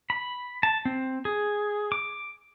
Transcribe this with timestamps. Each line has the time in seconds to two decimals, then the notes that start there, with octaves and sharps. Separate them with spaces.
0.10 B5
0.63 A5
0.85 C4
1.25 G#4
1.92 D6